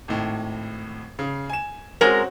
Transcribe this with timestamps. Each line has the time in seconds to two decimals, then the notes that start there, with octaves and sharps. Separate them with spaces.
0.08 G#1 A2
1.19 C#3
1.50 G#5 E7
2.01 G#3 C4 C#4 F#4 A#4